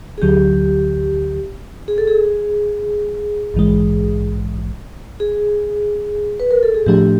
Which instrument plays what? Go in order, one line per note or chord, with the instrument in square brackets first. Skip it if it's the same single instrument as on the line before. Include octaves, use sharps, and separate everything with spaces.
[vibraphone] G#4
[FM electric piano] D2 D3 F#3 [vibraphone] G4
[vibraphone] G#4
A4
G#4
[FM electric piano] A#1 G#2 E3 G#3
[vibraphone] G#4
B4
A#4
A4
G#4
[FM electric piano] A2 F3 A3 D4 [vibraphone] G4